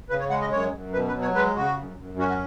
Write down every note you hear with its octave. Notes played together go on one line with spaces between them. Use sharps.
C#3 B4
C#5
G#3 F#5
D#5
F#2 C#5
F#2
B2 B4
B4
F#3
C#5
G#3 B4
C#3 F#4
F#2
F#2
C#4 F#4
F#4